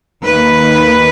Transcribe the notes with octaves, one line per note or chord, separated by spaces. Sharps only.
D#2 D#3 A#3 B4